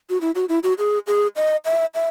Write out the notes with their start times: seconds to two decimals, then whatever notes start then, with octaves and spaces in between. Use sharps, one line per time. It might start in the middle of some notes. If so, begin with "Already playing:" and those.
0.10 F#4
0.21 E4
0.35 F#4
0.49 E4
0.63 F#4
0.78 G#4
1.07 G#4
1.36 D#5
1.65 E5
1.94 E5